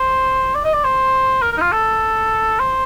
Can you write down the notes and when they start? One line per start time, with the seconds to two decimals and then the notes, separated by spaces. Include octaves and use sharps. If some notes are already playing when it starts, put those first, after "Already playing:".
Already playing: C5
0.55 D5
0.65 D#5
0.74 D5
0.84 C5
1.42 A#4
1.52 A#4
1.58 D#4
1.62 F4
1.72 A4
2.59 C5